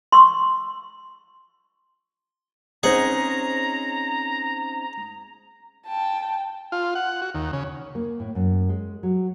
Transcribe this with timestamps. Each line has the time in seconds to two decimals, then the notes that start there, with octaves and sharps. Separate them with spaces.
0.12 C6 C#6 E6
2.83 C4 C#4 D#4 G#4 C5 D#5 F#5 A#5
5.87 G5 A5
6.72 F4
6.95 F#5
7.22 F#4
7.35 D#2
7.53 C#3
7.95 A#3
8.20 A2
8.35 F#2
8.69 G#3
9.03 F#3